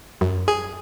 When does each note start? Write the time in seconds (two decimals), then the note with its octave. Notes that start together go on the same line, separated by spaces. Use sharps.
0.21 F#2
0.48 G#4